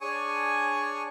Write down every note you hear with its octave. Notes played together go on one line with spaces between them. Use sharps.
D4 G#4 C#5 G#5 C#6 D#6